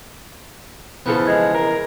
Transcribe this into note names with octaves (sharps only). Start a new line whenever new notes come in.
E2 C#3 F3 B3 A4
G#3 G#6
A#4